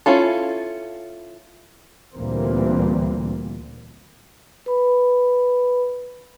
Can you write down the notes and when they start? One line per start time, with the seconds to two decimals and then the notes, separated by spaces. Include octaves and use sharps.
0.06 C#4 E4 F4 A4
2.15 D2 A#2 E3 G3 A#3 C4
4.66 B4 B5